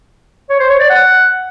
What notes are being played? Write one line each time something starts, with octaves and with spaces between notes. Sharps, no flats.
C#5
C5
C#5
D5
F#5